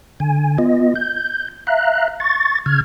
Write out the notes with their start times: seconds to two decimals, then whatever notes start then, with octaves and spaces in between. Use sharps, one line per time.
0.20 D3 G#5
0.58 B3 F4 D#5
0.95 G6
1.67 E5 F5 A#5 F#6
2.20 C#6 A6
2.66 C#3 F6 G#6